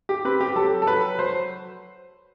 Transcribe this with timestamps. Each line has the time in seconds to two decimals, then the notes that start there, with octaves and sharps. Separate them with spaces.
0.09 G4
0.25 C4 B4
0.41 G4
0.56 F#3 A4
0.82 A4
0.87 F#3 B4
1.19 F#3 C5